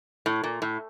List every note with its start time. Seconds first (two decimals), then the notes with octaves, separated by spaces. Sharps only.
0.26 A2
0.44 A#2
0.62 A2